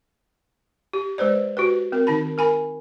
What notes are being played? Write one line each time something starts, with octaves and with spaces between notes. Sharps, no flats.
G4
G#3 B4 C5 D5
F#4 G4 B4
C4 A#4
D#3 D#4 A5 B5
A#4 G#5 B5